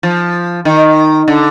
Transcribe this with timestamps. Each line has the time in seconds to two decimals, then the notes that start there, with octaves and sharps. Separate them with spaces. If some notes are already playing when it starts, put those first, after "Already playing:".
0.03 F3
0.65 D#3
1.28 D3